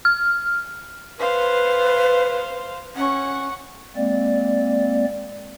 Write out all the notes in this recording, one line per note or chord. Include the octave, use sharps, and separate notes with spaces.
F6
B4 C5 F5
C#4 F#5 C#6
G#3 A#3 C4 D5